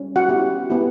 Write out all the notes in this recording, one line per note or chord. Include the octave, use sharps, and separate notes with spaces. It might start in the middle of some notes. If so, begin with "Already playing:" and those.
Already playing: G3 C#4
F#4 F#5
B3 E4 G4
B3 E4 G4